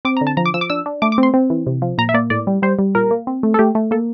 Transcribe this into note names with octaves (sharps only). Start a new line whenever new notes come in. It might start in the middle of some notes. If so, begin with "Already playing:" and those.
C4 D6
A#5
D3
A5
F3 A#5
D6
F3 E6
D6
D4 E6
D4
A3 D6
D6
C4
C6
C4
E3
C3
F3
A#2 A#5
E5
A#3 D5
A2 D5
G3
G3 C5
G3
A#2 A#4
A#3
C4
A3
A4
A3 G4
A3
A#3 A4